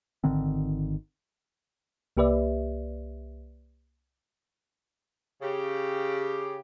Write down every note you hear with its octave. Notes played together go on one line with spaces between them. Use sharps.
G#1 D3 D#3 C4
C2 A#3 G4 B4 D5 E5
C#3 G4